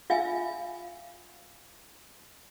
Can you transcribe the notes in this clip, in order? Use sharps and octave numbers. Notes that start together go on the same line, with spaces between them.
F4 E5 F5 G#5